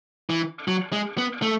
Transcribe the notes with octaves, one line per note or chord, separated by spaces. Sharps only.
E3
F#3
G#3
B3
A3